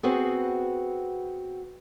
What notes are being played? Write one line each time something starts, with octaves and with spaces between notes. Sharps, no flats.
B3 C4 F#4 G#4 B4 C5